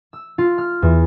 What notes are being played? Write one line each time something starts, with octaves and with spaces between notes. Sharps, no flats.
E6
F4
F6
E2